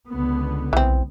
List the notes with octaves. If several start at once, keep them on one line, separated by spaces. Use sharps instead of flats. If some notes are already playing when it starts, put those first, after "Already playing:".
C#2 D3 B3
B1 E3 C4